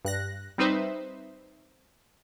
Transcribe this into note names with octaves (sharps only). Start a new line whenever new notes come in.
G2 F#6 A#6
G3 C4 D#4 B4 C5 E5